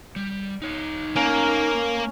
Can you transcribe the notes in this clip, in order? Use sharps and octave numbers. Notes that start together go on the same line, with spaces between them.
G3
D#4 C#5
A#3 C#4 A#4